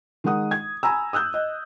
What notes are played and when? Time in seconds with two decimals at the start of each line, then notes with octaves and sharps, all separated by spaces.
0.24 D#3 G#3 D#4 F#5 D#6
0.51 G#6
0.83 G#5 A#5 B5 E6
1.13 D#6 E6 F#6 G6
1.34 D#5